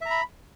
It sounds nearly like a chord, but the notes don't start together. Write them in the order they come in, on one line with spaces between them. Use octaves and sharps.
E5 A#5 B5